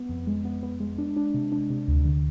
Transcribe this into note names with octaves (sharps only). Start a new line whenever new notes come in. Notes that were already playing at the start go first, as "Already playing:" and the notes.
Already playing: B3
F2
G#3
B3
B3
G#3
D4
D4
C3
D4
C3
D2
D3